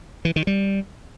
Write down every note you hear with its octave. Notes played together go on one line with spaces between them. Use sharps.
E3
D#3
G3